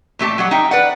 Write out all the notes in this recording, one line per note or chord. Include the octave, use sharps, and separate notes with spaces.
A#2 A3 G4 A5
F#3 G3 F#5
D#4 E5 G5
B4 D5 F#5